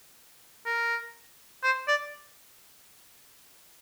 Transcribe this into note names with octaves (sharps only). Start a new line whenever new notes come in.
A#4
C5
D5